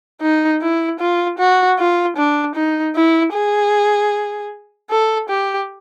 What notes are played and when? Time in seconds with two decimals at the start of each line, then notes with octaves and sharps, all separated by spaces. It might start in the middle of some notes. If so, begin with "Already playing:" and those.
0.22 D#4
0.61 E4
1.00 F4
1.39 F#4
1.78 F4
2.17 D4
2.55 D#4
2.95 E4
3.33 G#4
4.90 A4
5.29 G4